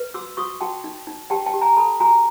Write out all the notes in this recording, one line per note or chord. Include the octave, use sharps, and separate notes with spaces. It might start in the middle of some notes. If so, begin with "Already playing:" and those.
Already playing: B4
F#4 D6 E6
F#4 C#6 D#6
F#4 G5 A5
D#4
D#4
G4 G5 A5
G5 A5
G4
G#5 A#5
A4 A5 B5
F#4 G#5 A#5